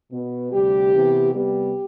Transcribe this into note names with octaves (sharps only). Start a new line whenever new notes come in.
B2 B3
D2 C3 G3 G4
C3 E3 B3
C3 G3 B3 G4